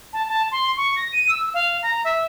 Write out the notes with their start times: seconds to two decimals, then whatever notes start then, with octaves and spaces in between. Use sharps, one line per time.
0.13 A5
0.28 A5
0.52 C6
0.77 C#6
0.96 A#6
1.13 D#7
1.29 E6
1.54 F5
1.83 A#5
2.04 E5